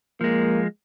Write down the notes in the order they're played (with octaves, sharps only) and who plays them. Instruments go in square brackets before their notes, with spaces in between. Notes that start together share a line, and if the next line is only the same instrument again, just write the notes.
[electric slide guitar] F3 G#3 [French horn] A#3